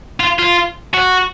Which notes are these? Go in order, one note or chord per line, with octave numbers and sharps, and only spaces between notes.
F4
F4
F#4